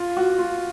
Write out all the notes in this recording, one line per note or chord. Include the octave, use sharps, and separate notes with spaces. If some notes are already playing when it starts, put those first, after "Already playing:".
Already playing: F4
F#4
F4